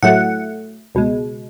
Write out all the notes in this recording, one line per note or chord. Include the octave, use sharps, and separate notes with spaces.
A2 F#3 A3 F#5
C#2 B2 G#3